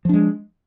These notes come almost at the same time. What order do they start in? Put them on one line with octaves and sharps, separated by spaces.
F3 D4 G#3